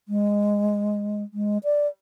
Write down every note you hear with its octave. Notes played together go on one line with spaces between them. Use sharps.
G#3
G#3
D5